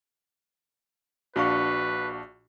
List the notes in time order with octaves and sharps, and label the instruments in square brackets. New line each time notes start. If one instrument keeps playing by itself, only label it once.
[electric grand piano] A#1 D4 F5 [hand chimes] F#4 C#6 [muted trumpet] B4